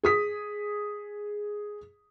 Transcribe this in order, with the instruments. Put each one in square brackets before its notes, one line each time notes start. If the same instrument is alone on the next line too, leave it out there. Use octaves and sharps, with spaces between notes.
[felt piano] G#4 D#6 B6